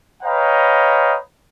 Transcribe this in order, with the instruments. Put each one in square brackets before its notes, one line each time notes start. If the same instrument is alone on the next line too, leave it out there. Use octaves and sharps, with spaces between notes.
[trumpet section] B4 C#5 D#5 F5 G5 A#5